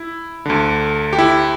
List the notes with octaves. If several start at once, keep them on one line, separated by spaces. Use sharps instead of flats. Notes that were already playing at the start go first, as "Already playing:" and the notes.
Already playing: E4
D2 D3
G4
E4